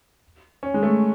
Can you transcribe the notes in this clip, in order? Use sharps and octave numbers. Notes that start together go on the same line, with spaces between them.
C#4
G#3
A3